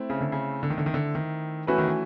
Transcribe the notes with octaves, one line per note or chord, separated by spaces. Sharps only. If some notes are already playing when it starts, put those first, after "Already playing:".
Already playing: A3 C4 E4
C#3
D3
C#3
D3
D#3
D3
D#3
D3
D#3
E3 A3 C#4 F#4 B4
D#3
E3